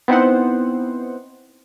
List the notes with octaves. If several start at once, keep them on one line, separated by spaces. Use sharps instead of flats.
B3 C4 D#4 E4 C5 F#5